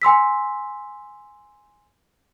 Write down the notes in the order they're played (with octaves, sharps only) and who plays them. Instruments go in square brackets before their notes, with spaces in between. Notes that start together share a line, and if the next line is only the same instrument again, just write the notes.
[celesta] G#5 C6 E6 B6